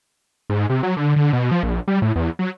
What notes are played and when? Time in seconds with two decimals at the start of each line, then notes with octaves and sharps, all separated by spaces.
0.50 G#2
0.70 C3
0.83 F#3
0.97 D3
1.16 D3
1.33 B2
1.51 F3
1.63 A#1
1.88 G3
2.02 A2
2.16 E2
2.39 F#3